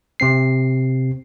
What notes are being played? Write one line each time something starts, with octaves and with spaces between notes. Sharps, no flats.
C3 C4 C7